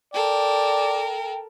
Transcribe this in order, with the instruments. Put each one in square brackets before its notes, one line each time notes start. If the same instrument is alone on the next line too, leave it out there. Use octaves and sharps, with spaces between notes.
[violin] A4 A#4 [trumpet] D5 [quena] G5